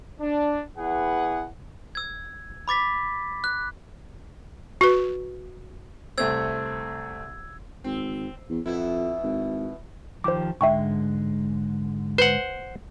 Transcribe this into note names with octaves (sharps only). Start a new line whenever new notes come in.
D4
E2 E4 G#4 B4 F#5
E6 G#6
B5 D6 A6 B6
F#6
F#4 B4
C2 A3 C4 E6 G#6
G#1 C4
E2
F2 B2 E4
G#1
D#3 F3 G4 C5 D6
G#2 D3 G#3 E5 G5 C#6
B4 C5 F#5